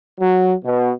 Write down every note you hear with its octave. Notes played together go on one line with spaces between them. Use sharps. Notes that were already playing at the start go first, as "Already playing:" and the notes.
F#3
B2